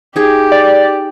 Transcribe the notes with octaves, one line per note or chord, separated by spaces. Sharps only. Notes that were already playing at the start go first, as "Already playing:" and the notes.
D#4 G4 G#4
D5